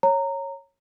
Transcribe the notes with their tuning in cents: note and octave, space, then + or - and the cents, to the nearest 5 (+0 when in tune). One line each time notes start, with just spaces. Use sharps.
C#5 -10 A#5 -15